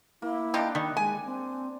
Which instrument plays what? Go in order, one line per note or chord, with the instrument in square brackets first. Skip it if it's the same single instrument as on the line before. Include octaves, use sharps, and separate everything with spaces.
[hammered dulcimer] A#3 [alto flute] E4
[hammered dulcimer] D4 B5 [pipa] D#4 F4 G4
[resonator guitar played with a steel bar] D#3 [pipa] G3
[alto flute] G#3 [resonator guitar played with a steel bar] G#5
[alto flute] C4